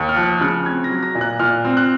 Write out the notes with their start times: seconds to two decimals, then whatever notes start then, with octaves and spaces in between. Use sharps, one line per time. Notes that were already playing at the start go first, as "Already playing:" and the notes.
Already playing: D#2
0.09 F6
0.16 F3 F#6
0.41 C#3 F#6
0.66 C4 G#6
0.84 A#6
0.90 F#3
1.03 A#6
1.15 A#2
1.21 F#6
1.39 A#2 F6
1.65 C4
1.77 F#6